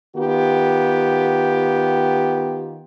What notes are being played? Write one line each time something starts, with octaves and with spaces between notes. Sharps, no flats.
D#3 B3 F4 G4